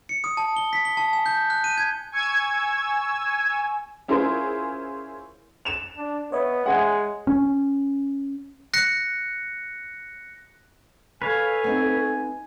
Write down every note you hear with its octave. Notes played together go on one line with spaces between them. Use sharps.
C#7
D#6
A5
G7
B6
G7
A5
G#5
G6
F#6
D#7
G#6
G#5 C#6 E6 G#6
C#4 E4 F4 G#4 A#4 C5
E7 F7
D4
B3 C#5 D#5 E5
G#3 F#5 G#5
C#4
F#6 A#6 C#7
A4 B4 C#5 F5 G#5
B3 C4 D#4